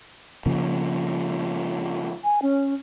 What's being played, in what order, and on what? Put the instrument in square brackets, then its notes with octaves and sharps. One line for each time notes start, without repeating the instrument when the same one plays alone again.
[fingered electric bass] C#3 F3 A#3
[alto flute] G#5
C#4